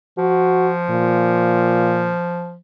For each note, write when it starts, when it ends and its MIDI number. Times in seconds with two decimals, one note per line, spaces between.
0.18 2.56 53
0.18 0.70 66
0.90 2.14 46